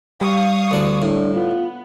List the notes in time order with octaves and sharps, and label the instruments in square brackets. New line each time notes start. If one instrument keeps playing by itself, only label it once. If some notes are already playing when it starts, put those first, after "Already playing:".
[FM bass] G3 [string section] F5 C#6 D#6
[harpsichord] D2 D4 [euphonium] E3
[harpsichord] A2 [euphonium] D4
[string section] B3 [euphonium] F4